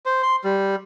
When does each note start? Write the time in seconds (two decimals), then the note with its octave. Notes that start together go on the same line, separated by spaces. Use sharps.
0.06 C5
0.23 C6
0.44 G3